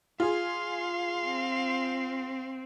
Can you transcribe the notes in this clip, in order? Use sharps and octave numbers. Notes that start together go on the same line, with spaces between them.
F4 G#4 F5 C6
C4